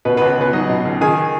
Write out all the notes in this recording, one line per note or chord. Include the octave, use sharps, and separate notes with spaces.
B2 B3 B4
B3 B4
C#2
C#2 B3 B4
F#3 D#4 D#5
B2
C#2
D#3 G#4 G#5